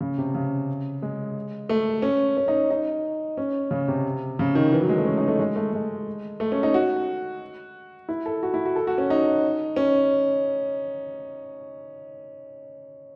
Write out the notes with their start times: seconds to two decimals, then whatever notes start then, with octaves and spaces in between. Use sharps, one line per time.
0.01 C#3
0.18 C3
0.35 C#3
1.02 G#3
1.69 A3
2.02 C#4
2.37 C#4
2.48 D#4
2.71 D#4
3.37 C#4
3.71 C#3
3.88 C3
4.39 C#3
4.55 D#3
4.72 E3
4.81 F#3
4.89 G#3
4.97 A3
5.06 C#4
5.17 D#4
5.28 A3
5.39 G#3
5.56 A3
5.73 G#3
6.40 A3
6.52 C#4
6.63 D#4
6.74 F#4
8.09 E4
8.26 A4
8.43 F#4
8.54 E4
8.65 F#4
8.76 A4
8.87 F#4
8.98 C#4
9.10 D#4
9.76 C#4